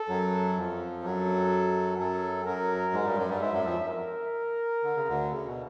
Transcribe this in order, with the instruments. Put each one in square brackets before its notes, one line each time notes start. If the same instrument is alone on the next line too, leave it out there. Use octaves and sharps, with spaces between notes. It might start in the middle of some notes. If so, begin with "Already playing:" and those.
Already playing: [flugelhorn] A4
[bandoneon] F#2 F#3
F2 F3
[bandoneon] F#2 F#3 [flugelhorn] A4
[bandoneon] F#2 F#3 [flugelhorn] A4
[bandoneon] F#2 F#3 [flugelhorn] A#4
[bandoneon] G#2 G#3
G2 G3
F#2 F#3
G2 G3
[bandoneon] G#2 G#3 [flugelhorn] E5
[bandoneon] F#2 F#3
F2 F3
[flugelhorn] A#4
[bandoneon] D3
C#3
D2 D3
C#3
B2